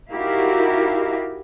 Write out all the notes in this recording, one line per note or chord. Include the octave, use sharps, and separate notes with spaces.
D#4 E4 F#4 G4 A#4 F5